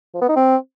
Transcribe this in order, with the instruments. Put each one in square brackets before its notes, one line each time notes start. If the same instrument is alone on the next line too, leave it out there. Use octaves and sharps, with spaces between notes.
[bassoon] F3
B3
D#4
C4